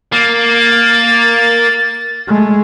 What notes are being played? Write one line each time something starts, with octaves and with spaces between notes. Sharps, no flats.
A#3 A6
G#3 A3